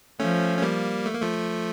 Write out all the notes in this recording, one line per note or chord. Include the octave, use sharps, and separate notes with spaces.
F3 A3 C#4
C#4
G3 A#3
A3
A#3
F3 A3